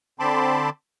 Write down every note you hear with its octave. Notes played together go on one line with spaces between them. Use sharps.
D3 C4 A5 B5 C6 D6